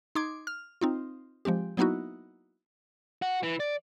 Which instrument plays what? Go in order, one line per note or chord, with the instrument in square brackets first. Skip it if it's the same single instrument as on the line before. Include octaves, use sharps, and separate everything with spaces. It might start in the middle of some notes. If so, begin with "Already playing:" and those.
[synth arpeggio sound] D#4 C6 D6 G#6
F6
C4 D#4 F4
F3 G#3 C4 G4
F#3 A#3 B3 D#4 E4 F#4
[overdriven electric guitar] F#4
E3
D5